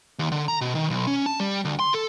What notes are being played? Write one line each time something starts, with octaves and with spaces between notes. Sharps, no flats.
D#2
D3
A#5
B2
D#3
B1
C#4
A5
G3
D2
C6
A4